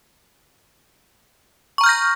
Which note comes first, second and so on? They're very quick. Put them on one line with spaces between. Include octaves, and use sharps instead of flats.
C#6 A#5 F6 G6 A#6